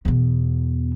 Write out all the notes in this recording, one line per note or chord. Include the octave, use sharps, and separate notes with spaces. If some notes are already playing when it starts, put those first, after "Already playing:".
E2 B2